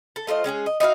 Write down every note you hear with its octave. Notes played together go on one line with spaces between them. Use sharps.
A4
A3 F4 C5 D#5
G#3 C#4 G4 G#4
D#5
D#4 E4 F#4 F5